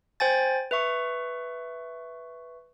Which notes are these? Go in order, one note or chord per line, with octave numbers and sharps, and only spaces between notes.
C5 G5 G#5 A6
B4 E5 C#6